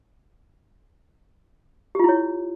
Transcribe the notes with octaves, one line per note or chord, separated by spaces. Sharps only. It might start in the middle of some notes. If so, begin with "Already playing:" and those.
E4 F4 G4 C#5